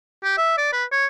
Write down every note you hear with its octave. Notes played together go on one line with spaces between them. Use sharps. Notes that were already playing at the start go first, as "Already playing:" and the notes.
G4
E5
D5
B4
C#5